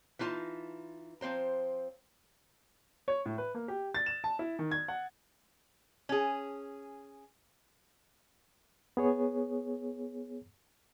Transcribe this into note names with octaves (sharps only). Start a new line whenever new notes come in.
E3 D#4 F4 A5
F3 C4 C5 A#5
C#5
A2
B4
A#3
G4
A6
E7
A5
E4
D#3
G#6
F#5
C#4 G#4
B3 G#4 C#5